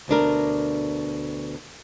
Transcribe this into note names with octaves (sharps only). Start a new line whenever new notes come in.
D2 B2 D4 A#4